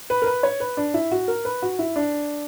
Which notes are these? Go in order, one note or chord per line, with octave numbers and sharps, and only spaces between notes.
B4
A#4
B4
C#5
B4
D4
E4
F#4
A#4
B4
F#4
E4
D4